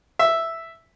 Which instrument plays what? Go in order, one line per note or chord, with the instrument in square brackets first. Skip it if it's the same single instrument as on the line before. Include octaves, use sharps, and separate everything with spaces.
[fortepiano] E5